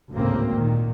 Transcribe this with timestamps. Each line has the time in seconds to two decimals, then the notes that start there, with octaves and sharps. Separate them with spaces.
0.11 G#1 D2 A2 C#3 A#3 C4
0.56 A#2 D#3